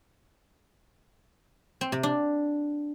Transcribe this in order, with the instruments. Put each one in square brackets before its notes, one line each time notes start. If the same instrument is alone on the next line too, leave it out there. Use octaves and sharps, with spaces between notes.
[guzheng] C4
C3
D4